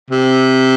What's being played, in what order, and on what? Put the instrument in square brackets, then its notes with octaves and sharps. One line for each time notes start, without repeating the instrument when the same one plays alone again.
[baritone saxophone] C3